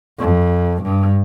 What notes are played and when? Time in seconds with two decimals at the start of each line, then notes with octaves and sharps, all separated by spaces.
0.19 F2
0.82 G2